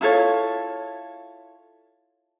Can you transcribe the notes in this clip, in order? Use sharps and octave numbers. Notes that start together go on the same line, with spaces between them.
E4 F4 A4 C#5